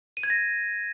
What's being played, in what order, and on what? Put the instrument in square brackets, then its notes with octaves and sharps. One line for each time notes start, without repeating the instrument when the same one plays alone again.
[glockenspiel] D#7
G#6
A#6